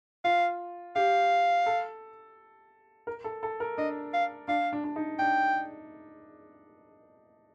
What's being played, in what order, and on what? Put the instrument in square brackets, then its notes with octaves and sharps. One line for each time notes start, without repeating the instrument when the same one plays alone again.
[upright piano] F4 [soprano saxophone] F5
[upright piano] G4 [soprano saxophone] F5
[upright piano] A4
A#4
A4
A4
A#4
[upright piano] D4 [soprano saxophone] D#5
[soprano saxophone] F5
[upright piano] D4 [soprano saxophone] F5
[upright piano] D4
D4
D#4
[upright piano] D4 [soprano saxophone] G5